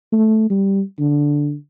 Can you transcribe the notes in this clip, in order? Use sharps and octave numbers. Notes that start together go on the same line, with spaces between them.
A3
G3
D3